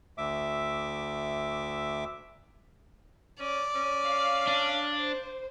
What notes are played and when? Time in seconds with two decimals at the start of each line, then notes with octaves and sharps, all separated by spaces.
0.18 D2 E5 D6
3.40 C#4 D5
3.75 C#4
4.04 F5
4.47 D4
4.98 C5